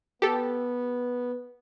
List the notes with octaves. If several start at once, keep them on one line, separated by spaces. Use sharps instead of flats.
B3 G4 A4